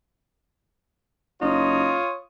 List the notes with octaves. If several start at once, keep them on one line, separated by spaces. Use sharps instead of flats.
F#1 D#4 F4 C#5 D#6